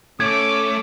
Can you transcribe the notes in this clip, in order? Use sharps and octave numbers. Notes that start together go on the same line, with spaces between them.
A3 C#4 D6 G#6